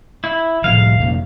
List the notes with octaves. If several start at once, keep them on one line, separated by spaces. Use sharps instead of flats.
E4
A2 C3 F3 F5
F2 C3 A#3